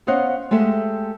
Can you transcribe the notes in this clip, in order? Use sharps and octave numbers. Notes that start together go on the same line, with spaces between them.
B3 C#4 C5 D#5 F5 F#5
G#3 A3 G4 A4